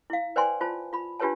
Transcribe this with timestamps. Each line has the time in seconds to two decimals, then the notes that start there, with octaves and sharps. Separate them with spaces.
0.10 E4 F5
0.36 B4 C5 D5 G5 G#5 C6
0.61 F4 C5 A5
0.93 F4 B5
1.20 D4 F4 G4 B4 C#5 A5